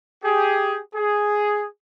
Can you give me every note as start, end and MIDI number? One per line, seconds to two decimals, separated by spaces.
0.24 0.80 67
0.24 0.80 68
0.95 1.66 68